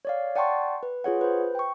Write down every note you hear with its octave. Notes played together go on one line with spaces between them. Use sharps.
C#5 D5 F5
D5 F#5 G5 A5 C6 C#6
B4
F4 G#4 C#5 F#5
B4 C5
G5 C#6